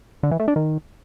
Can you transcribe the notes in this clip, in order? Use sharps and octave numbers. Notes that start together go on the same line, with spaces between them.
D3
E3
A3
D4
D#3